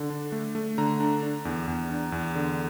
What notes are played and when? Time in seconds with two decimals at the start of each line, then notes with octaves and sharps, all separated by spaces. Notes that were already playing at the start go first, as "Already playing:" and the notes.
Already playing: D3
0.10 D4
0.32 A3
0.55 A3
0.78 D3 A#5
1.00 D4
1.23 D4
1.45 E2
1.68 E2
1.90 D4
2.12 E2
2.35 D3